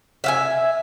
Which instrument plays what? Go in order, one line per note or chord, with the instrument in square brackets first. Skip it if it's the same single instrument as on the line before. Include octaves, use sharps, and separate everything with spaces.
[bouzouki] E5 F5 G#5